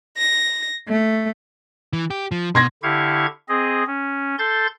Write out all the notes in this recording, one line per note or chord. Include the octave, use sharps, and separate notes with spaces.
A#6
A3
E3
G4
F3
B2 C6 G#6 A#6
D3 E4 G4 F5 C#6 G#6
C4 G#4 D#5
C#4
A4 C6 G6 A6